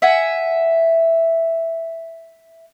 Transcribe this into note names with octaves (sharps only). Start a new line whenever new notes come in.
E5 F#5 G#5